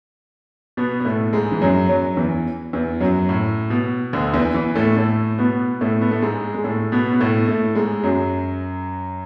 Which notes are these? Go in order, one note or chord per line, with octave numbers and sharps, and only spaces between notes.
B2 B3
B3
A2 A3
G#2 G#3
E3
F#2 F#3
F#2 F#3
E2 E3
E2 E3
F#2 F#3
A2
B2
D2 D3
E2 E3
E2 E3
A2 A3
A2 A3
B2 B3
A2 A3
B3
A3
G#2 G#3
G#3
A2 A3
B2 B3
B3
A2 A3
A2 A3
G#2 G#3
F#2 F#3